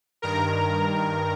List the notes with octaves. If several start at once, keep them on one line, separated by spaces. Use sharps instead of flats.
G2 D#3 A#4 A#5